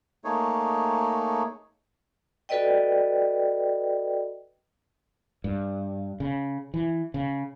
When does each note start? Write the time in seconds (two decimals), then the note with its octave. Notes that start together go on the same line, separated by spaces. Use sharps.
0.24 A3 A#3 D#4 G#4 C#5
2.49 F#4 A4 B4 D5 D#5 G5
5.44 G2
6.20 C#3
6.74 E3
7.14 C#3